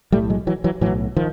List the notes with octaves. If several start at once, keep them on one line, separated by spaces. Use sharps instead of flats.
B1 A2 G3 A3
F#3 G#3
E3 F#3
E3 F#3
B1 A2 E3 F#3
D#3 F3